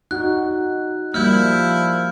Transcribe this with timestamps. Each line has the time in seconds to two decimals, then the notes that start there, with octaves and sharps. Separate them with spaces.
0.11 D#4 F#4 F#6
1.14 F3 G3 A#3 E4 F6 G6